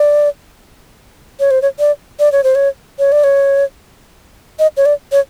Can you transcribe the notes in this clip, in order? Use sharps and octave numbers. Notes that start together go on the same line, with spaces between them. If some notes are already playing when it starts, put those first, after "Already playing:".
Already playing: D5
C#5
C5
C#5
D5
D5
C#5
C5
C#5
C#5
D5
C#5
D#5
C#5
D5
C#5